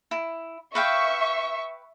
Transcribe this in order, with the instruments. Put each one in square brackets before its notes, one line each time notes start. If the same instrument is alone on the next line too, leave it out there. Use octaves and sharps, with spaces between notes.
[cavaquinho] E4
[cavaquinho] B4 F5 G5 [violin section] E5 C#6